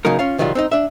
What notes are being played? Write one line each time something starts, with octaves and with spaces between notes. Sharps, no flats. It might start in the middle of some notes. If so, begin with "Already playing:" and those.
C#3 F#3 A#3 D#4 A#4
C#4 F4 F5
C3 D#3 F#3 G3 F4
C4 D4 D#4
D4 E5